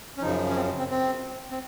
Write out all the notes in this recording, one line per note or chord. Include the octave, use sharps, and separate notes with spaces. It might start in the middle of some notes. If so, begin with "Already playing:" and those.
C#4
F#2 C#3 F3 D#4
C#4
C4
C4
C4
C4